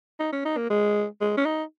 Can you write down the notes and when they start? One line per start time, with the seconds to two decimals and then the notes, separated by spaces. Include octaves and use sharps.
0.20 D#4
0.33 C#4
0.45 D#4
0.57 A#3
0.70 G#3
1.21 G#3
1.38 C#4
1.46 D#4